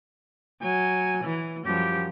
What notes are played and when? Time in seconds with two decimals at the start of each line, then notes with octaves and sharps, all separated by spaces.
0.61 F#3 G#5
1.24 E3
1.65 F#2 F3 G3 G4